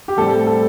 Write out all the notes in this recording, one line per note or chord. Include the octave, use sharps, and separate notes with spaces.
G4
A2 G3 C4 A4
A4